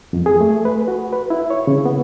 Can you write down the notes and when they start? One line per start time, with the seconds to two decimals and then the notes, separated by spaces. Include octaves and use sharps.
0.13 F2
0.26 G#4
0.41 A3
0.65 B4
0.88 F#4
1.13 B4
1.30 E4
1.50 C#5
1.67 C#3
1.86 B3